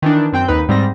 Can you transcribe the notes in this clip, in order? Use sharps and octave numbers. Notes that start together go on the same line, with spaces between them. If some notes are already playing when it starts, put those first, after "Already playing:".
D#3 E3 D4
F#2 C4 G5 G6
D#2 D#4 B4
G#2 G3 C4 A#6